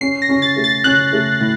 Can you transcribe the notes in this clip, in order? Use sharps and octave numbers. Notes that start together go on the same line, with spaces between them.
C#4 C7
A#6
C#4
A6
A3
A6
C#4 F#6
A3
A2